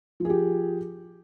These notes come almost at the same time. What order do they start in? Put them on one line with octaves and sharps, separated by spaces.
F3 G#4 G4